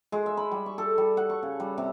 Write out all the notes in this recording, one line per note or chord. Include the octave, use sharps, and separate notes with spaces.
G#3
E5
B5
G3
C#6
A4
G3
F#5
C#6
C#3
G3
C3